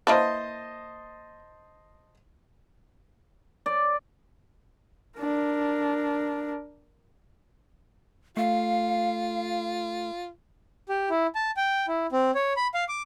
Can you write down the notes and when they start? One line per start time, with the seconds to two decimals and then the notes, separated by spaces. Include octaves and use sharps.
0.07 A#3 E4 B4 C5 D#5 A5
3.66 D5
5.19 D4 A#4
8.37 A3 F4 F5
10.89 G4
11.10 E4
11.35 A5
11.57 G5
11.88 E4
12.12 C4
12.35 C#5
12.57 B5
12.74 F5
12.88 D6